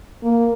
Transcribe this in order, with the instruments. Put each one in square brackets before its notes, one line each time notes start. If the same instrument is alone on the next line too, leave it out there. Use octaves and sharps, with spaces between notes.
[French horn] A#3